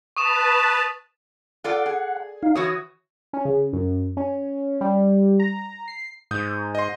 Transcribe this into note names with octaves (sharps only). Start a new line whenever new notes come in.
B4 A5 C#6 D#6 E7
F4 A4 D5 F#5
G#4
D#4 F5
E3 F#4 C#5 D#6
C#4
C#3
F#2
C#4
G3
A#5
C7
G#2 D#6 G6
D#5 C6